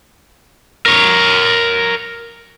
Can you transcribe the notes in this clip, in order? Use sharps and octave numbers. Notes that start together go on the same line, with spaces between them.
A#4 C#5